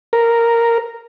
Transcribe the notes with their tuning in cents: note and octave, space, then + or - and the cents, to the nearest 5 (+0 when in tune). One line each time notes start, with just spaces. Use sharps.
A#4 -5